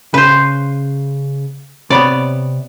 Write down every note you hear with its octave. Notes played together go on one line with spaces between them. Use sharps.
C#3 B4 C5
C3 B3 C#5 D5 B5